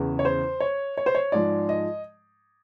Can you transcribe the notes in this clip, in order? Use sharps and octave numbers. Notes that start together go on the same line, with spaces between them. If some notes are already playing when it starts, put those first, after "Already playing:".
Already playing: E2 C#3 E3
C#5
C5
C#5
C#5
C5
C#5
G#2 F3 G#3 D5
D#5